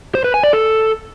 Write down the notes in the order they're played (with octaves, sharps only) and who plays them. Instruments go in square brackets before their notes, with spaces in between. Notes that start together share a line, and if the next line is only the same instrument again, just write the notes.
[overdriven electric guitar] C5
B4
G#5
D5
A4